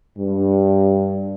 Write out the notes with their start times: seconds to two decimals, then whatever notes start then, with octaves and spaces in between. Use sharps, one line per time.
0.18 G2